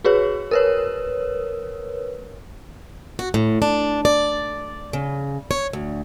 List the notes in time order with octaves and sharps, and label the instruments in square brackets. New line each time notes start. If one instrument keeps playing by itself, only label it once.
[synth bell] F#4 G#4 B4 C#5
A#4 B4 C#5
[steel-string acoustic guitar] F#4
A2
D4
D5
C#3
C#5
D2